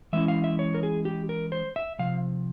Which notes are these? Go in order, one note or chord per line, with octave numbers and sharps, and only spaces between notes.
E3 G#3 C#4 E4 E5
F5
E5
C#5
A#4
G#4
G4
A#4
C5
E5
C3 F3 F5